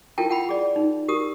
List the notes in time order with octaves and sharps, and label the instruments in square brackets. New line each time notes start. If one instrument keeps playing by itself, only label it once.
[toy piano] E4 F4 A4 A#4 G5 A5
F#5 G5 B5
G#4 D5
D#4
G4 A#4 D#6